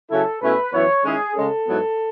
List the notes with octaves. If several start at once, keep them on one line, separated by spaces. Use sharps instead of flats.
C#3 F#3 C#4 E4 A4
B2 A3 C#4 E4 B4
F#2 E3 B3 E4 C#5
D#3 G#3 C#4 E4 G#4
C#3 G#3 C#4 A4
G#2 F#3 B3 E4